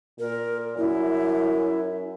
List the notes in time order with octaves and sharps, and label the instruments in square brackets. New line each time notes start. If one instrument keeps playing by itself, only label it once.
[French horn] A#2 [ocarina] A#4
[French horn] F#2 [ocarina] E4